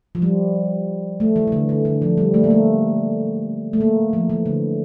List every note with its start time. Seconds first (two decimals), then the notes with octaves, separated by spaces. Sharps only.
0.15 F3
0.22 G3
1.20 A3
1.36 E3
1.47 E3
1.52 D3
1.69 D3
1.85 D3
2.02 F3
2.18 G3
2.34 A3
2.44 A#3
2.50 A3
3.73 A3
3.81 A#3
4.13 F3
4.30 E3
4.46 D3